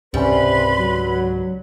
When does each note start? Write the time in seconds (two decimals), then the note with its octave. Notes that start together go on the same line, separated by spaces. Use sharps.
0.14 C#2 G#2 C3 G3 C#4 B4 B5 C6
0.78 F#3